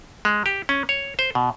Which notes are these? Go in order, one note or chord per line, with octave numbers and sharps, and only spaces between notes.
G#3
G4
C#4
C#5
C5
B2